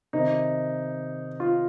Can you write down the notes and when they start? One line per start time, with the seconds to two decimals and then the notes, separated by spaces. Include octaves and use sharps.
0.13 C3 D#3 D#4
1.40 F4